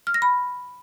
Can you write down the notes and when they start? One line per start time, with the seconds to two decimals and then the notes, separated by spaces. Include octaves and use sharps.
0.07 F6
0.14 A#6
0.22 B5